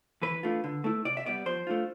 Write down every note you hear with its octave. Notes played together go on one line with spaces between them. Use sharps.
E3 B4
A3 D4 F4
D3
A3 E4
C3 D5
E5
G3 B3 D5
F3 C5
A3 D4 F4